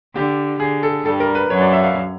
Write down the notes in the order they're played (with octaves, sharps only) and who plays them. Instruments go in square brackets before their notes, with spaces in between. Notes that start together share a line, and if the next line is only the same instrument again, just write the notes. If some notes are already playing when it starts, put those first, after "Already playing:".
[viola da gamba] D3 [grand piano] G4
[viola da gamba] D3 [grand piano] G#4
[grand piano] A4
[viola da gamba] G2 G3 [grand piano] A4
[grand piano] A#4
B4
[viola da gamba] F#2 F#3 [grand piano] C#5
[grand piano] D5
E5
F5